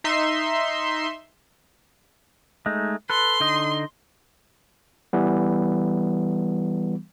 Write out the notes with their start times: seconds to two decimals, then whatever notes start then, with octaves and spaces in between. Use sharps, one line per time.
0.04 D#4 E5 C6
2.66 G#3 A3 D#4
3.10 A4 B4 C6
3.40 D3 D#4 D#5
5.13 E3 G3 B3